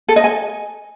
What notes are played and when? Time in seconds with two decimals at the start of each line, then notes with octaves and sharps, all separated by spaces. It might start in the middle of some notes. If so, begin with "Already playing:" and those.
0.09 A4
0.16 D#5
0.24 G#5